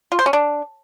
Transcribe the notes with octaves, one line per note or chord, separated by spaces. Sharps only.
F4
C5
C#4
D4